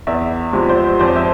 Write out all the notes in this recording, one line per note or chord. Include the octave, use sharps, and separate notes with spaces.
E2 D5 E5
C3 F3 G#3
C5 D5
F2 C5 D5
E5